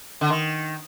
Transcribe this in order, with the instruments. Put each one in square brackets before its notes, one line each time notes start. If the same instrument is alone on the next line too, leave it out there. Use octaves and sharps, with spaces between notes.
[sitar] D3
D#3